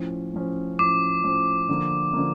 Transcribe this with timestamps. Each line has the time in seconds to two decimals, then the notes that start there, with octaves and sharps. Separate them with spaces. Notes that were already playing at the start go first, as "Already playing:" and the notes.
Already playing: A2 F3 C#4
0.34 A2 F3 C#4
0.79 A2 F3 C#4 D6
1.24 A2 F3 C#4
1.69 D3 F3 A#3
2.13 D3 F3 A#3